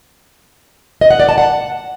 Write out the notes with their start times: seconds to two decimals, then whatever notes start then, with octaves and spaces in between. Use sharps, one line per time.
1.01 D#5
1.10 F#5
1.20 D5
1.29 A5
1.38 F#5